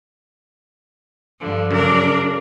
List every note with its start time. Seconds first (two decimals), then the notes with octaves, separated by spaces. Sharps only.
1.38 G2 D3 F3
1.71 F#2 C#3 D4 A#4 D5